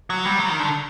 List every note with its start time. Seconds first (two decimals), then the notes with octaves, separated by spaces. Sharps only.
0.10 F#3
0.25 G3
0.40 F#3
0.49 D#3
0.59 D3